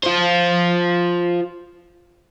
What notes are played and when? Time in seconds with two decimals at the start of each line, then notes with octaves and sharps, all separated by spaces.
0.04 F4 C5